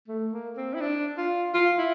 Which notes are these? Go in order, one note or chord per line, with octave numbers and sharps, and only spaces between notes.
A3
A#3
C4
E4
D4
F4
F4
E4